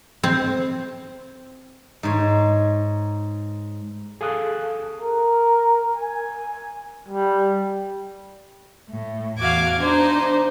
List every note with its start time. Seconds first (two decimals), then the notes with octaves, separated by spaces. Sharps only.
0.23 C4
2.03 G#2 C#5
4.21 G#4 A4 F5 A5 D#6 F#6
5.01 A#4
5.95 G#5
7.08 G3
8.89 A2
9.39 E2 F#4 F5 D6 G#6
9.80 D4 D#4 C5